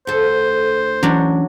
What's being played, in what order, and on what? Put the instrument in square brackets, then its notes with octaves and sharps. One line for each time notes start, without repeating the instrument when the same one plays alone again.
[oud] D2 A4 [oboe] C5
[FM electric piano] E3 C#4 [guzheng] F#3 D4